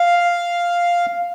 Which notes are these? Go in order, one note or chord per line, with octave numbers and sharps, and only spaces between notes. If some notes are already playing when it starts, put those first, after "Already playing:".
Already playing: F5